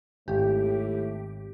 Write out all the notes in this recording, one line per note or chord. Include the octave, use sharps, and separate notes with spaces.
G#1 A2 G4